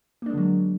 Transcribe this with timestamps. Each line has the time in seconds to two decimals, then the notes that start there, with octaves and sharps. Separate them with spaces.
0.22 A#3
0.26 D4
0.30 G#3
0.34 D3
0.38 F#3